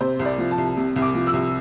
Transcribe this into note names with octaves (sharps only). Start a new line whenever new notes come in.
C3 C5
C2
D5
F3
A5
C2
C3
C2
D6
F3
E6
C2